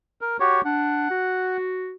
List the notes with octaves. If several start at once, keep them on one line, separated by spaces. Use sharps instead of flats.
A#4
F#4 G4 C#5
D4 F#5
F#4